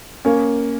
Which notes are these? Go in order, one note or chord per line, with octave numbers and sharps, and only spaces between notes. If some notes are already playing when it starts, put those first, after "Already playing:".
A#3 C#4